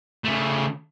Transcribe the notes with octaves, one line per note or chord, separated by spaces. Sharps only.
C#3 A3